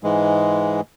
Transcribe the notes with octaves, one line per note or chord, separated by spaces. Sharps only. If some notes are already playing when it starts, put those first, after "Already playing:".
G#2 E3 G#3